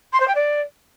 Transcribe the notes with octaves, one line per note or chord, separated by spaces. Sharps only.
C6
C5
G5
D5